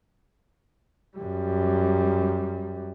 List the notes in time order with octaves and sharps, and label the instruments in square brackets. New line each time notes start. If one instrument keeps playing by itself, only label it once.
[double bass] F#2 G3